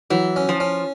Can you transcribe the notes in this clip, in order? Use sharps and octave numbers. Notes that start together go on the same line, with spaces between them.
E3 F#3
C#4
F3
C#4